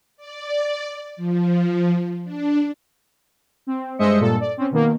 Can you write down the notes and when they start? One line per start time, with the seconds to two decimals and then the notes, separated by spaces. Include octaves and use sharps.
0.17 D5
1.16 F3
2.24 D4
3.67 C4
3.99 G2 G#3 C5 D#5 E5 C#7
4.19 G2 A#2 A4
4.40 D5
4.57 C4 C#4
4.71 B2 D#3 A#3